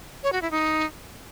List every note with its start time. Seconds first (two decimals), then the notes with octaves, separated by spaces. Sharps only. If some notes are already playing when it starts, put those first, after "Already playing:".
0.23 C#5
0.33 F#4
0.42 E4
0.51 D#4